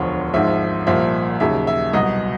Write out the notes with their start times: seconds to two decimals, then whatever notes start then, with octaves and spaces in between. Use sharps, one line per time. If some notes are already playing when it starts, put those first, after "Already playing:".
Already playing: E1 D2 D3 F3 C#5
0.33 G#1 G#2 F3 E5
0.87 C2 A#2 F3 E5
1.40 D#2 C#3 F#3 E5
1.67 E5
1.93 C2 B2 F#3 D#5